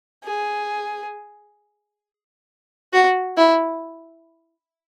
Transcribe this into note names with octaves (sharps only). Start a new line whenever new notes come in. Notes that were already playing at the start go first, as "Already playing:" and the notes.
G#4
F#4
E4